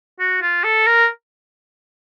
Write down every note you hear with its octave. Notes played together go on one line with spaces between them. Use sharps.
F#4
F4
A4
A#4